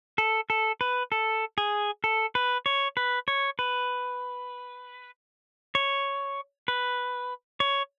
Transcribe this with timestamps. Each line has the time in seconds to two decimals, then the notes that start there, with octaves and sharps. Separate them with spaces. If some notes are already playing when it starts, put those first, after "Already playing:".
0.18 A4
0.50 A4
0.81 B4
1.12 A4
1.58 G#4
2.04 A4
2.35 B4
2.66 C#5
2.97 B4
3.28 C#5
3.59 B4
5.75 C#5
6.68 B4
7.60 C#5